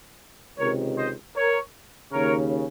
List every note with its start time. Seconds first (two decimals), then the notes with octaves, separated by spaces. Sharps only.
0.59 C#2 C3 D#3 A#4 C#5
0.98 C5 D#5
1.36 A#4 C#5
2.12 D#2 C#3 A#4 C#5